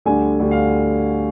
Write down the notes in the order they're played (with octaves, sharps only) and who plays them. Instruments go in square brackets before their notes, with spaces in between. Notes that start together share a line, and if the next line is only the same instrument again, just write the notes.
[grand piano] D2 D3 G3 G#5
D2 D3 G3
F5